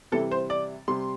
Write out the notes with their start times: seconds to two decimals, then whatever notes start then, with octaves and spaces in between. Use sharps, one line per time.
0.12 C3 E3 G3 A4
0.31 C5
0.50 D5
0.88 C3 G3 C6